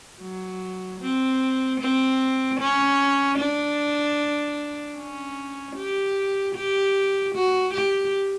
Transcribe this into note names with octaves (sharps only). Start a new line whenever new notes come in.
F#3
C4
C4
C#4
D4
C#4
G4
G4
F#4
G4